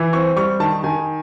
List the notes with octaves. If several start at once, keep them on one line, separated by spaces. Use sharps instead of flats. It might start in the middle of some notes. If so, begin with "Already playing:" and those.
Already playing: E3
C4 C#6
G3 C#6
D#3 A5
D#3 G#5